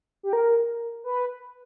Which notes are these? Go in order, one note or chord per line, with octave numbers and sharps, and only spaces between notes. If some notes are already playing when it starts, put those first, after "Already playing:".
G4
A#4
B4